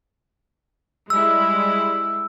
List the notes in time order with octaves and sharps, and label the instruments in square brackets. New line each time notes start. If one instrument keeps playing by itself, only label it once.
[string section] G3 G#3 E4 [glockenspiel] E6